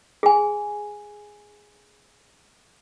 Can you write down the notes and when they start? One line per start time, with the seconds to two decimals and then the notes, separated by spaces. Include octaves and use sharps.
0.23 G#4 G#5